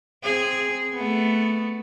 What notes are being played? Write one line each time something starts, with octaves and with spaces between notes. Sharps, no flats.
C4 G#4
A3 B3